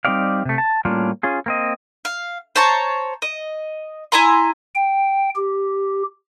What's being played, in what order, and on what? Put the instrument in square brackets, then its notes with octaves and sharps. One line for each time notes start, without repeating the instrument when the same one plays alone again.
[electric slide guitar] G3 C4 D#4 G4 D5 F5
C3 A3
A5
A2 G3 A#3 C#4 D4 F4
C#4 F4 G#4
A#3 C4 D#5
[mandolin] F5
C5 C#5 A5 A#5
D#5
E4 G#5 A#5 C6
[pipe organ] G5
G4